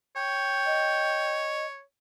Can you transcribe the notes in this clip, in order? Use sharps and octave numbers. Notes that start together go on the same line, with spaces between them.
C#5 G5
D#5